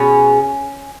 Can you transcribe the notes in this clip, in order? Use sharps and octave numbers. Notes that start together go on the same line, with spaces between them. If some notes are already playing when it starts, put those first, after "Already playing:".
Already playing: B2 G#3 C#4